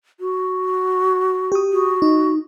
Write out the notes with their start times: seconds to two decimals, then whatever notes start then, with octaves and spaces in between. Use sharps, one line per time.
0.20 F#4
1.52 G4 D#6
1.72 F#4
2.02 D#4